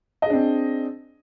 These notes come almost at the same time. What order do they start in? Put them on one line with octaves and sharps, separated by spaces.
D#5 G#4 D4 C4